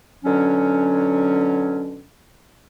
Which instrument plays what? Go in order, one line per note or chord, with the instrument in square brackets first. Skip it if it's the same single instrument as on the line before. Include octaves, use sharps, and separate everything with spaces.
[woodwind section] B2 D3 F#3 C#4